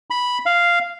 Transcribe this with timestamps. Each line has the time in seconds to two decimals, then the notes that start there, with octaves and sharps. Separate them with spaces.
0.10 B5
0.46 F5